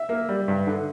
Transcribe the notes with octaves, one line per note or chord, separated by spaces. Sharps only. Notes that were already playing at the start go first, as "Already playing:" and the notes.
Already playing: E5
A#3
G3
G2
D3